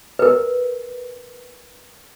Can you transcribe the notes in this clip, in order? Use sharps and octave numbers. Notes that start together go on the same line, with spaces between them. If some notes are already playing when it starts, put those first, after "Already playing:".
A#4 B4